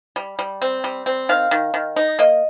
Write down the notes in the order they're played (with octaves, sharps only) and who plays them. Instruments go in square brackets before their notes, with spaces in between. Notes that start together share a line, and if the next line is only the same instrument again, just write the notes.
[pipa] G3
G3
C4
G3
C4
D#3 F5
D#3
D#3
D#4
A#3 D#5